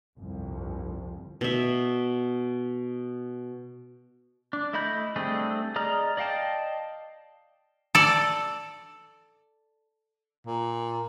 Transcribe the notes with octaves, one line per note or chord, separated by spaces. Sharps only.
G1 C2 F2
B2 E5
D4
A3 E4 D#5 B5 G6
G3 A3 C4 D4 G#4
G#4 D5 D#5 A#5 F6
D5 D#5 F5 G5 A5
A4 D5
A#2